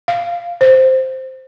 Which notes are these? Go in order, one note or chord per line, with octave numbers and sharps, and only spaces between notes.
F5
C5